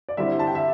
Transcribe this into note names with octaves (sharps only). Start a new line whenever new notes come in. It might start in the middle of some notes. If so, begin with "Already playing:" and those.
D5
D3 G3 C4 E4 E5
A5
G5
E5